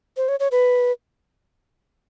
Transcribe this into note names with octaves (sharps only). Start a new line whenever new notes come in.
C5
C#5
C#5
B4